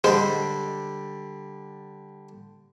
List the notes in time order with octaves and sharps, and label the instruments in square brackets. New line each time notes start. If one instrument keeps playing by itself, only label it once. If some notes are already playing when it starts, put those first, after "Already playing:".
[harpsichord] D3 G3 D5 [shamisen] G#3 C5 A5